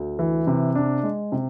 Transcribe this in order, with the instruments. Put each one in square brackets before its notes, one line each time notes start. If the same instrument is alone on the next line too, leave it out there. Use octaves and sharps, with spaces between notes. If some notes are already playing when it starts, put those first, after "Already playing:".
Already playing: [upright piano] D2
E3
C3
D4
G#3
C3